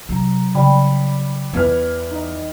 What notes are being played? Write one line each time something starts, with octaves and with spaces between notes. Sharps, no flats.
C3 F#3 A#5
C#3 G3
E2 E3 B3 B4 F6 G#6
D#4 D#5